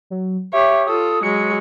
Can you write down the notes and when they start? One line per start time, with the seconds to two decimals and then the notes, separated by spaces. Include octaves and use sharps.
0.10 F#3
0.53 G4 C#5 E5
0.87 F4 A4 D#6
1.23 F#3 G#3 C#7